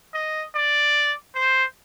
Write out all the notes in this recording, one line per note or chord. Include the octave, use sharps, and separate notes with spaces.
D#5
D5
C5